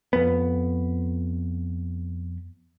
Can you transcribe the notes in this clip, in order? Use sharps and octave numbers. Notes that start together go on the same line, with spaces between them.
F2 B3